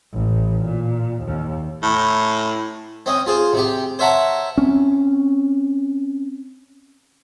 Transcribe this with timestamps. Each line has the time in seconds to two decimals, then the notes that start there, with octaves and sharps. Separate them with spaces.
0.13 A1
0.64 A#2
1.23 D#2
1.83 A2
3.06 C4 C#4 D#5
3.26 F4 G#4 C5
3.53 C3 G4
3.99 C5 C#5 E5 F#5 A5 A#5
4.57 C4 C#4